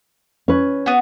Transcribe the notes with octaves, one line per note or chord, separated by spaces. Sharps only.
C#4 B4
B3 F#4